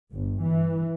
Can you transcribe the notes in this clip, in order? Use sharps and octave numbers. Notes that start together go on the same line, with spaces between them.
G1
E3